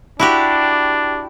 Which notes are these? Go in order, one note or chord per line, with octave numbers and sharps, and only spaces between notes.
D4 E4 F#4 G4